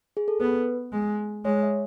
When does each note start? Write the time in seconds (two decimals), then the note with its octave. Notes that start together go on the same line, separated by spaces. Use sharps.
0.17 G#4
0.28 A4
0.40 B3 B4
0.92 G#3
1.45 G#3 C#5
1.63 E5